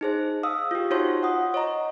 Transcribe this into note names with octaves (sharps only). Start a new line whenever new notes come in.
D#4 G#4 C5
F5 D#6 E6
F4 G4
D#4 F4 F#4 C5 C#5 C6
F#5 D#6
C#5 D#5 A#5